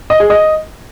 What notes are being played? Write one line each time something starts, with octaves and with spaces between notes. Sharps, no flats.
D#5
G#4
D#5